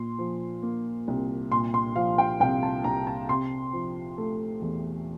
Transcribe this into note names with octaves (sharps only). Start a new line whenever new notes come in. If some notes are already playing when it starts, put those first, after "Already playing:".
Already playing: A#2 C6
F3
A#3
C2
A#2 C6
C6
F3 F5
G5
C2 G5
A5
C2 A#5
A5
C3 C6
F3
A3
E2